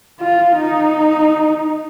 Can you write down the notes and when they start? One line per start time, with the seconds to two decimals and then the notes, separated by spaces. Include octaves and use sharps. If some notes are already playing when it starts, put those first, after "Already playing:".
0.21 F4
0.56 D#4